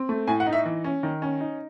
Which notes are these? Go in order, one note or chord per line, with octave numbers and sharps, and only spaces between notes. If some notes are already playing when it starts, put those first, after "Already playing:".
Already playing: C4
A3
A2 G#5
F#5
D#4
E5
E3
C#4
D#3
C#4
D#4